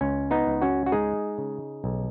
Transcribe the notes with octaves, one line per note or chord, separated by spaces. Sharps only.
C#2 C#4
B3 D#4
C#2
C#4 F#4
F#4
G#3 D#4 G#4
C#3
B1